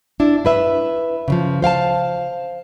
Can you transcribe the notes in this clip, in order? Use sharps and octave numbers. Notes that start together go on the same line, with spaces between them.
D4 E4
E4 B4 E5
C#3 E3 F3
C5 F5 G5 A5